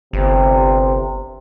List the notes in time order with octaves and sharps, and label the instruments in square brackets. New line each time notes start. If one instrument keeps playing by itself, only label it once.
[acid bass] G1 [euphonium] C3